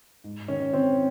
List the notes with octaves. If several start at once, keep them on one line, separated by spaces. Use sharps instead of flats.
G#2
D#3 C#4
D#3 C4